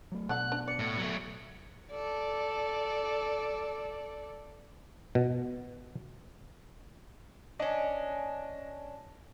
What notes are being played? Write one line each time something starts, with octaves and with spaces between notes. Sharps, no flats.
F#3 A3
B2 D3 D4 F#5 F#6
D4
D5 C#7
A2
F#3 A3
A4 D5
B2
C#4 D4 D#5